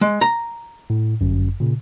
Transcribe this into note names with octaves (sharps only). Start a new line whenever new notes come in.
G#3
A#5
A2
G1 F#2
A#2 C#3